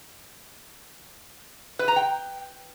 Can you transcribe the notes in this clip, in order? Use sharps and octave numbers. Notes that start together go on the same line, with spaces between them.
B4
A#5
G5